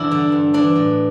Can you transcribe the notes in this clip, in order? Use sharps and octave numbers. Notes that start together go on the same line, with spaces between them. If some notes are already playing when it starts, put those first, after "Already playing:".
Already playing: E2 G2 D4 E4
D3
G2
E3 D4
A2